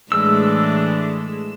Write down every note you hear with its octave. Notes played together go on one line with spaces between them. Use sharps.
A2 E3 G#3 D4 E6